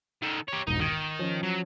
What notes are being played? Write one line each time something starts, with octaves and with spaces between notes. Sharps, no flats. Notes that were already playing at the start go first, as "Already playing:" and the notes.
D#3 A4
G4 C#5
E1 A#1 G#2 D#4
D#3 D#6 G#6 D#7
F3 C#4
F#3